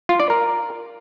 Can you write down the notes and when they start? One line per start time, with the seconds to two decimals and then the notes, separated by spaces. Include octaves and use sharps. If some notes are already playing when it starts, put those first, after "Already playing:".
0.09 F4
0.20 D5
0.30 A#4